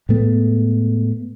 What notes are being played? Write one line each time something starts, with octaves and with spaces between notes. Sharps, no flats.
A2 G#3 A3 B3